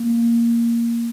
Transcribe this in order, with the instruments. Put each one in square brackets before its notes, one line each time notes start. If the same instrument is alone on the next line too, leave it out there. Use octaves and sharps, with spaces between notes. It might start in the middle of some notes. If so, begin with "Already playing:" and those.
Already playing: [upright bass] A#3